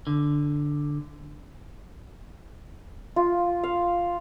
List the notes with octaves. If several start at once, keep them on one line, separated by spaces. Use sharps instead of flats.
D3
F4
F5